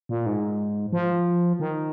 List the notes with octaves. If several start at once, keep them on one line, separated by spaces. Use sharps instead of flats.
A#2
G#2
F3
D#3